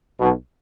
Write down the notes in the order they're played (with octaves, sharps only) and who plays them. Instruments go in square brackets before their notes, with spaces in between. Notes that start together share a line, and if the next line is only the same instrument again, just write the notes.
[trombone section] B1 B2